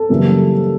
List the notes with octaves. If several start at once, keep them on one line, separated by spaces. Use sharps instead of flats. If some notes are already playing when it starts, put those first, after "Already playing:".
Already playing: A4
F#2 C#3 E3 G3 A#3